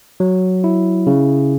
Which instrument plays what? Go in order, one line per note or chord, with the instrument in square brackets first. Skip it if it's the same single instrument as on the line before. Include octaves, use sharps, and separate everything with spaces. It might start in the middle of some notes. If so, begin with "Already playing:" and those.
[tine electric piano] F#3
E4
C#3